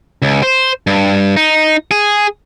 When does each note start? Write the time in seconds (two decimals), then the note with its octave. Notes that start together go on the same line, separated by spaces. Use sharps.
0.22 C#2
0.43 C5
0.87 G2
1.37 D#4
1.91 G#4